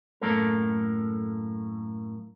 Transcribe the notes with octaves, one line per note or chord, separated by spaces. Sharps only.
F#2 A2 A3 A#3 A4 A#4